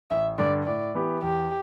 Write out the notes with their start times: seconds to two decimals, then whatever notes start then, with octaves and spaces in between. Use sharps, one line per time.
0.10 A1 E5
0.38 G2 D3 D5
0.66 A2 D5
0.94 E3 B3 G4
1.22 E2 G4